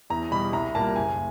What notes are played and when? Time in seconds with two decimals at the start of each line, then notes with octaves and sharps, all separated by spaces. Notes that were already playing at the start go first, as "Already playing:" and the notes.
0.10 E2 A#5
0.31 B2 G3 B5
0.53 C2 A#5
0.75 A#2 G3 A#3 A5
0.96 F#1 G#5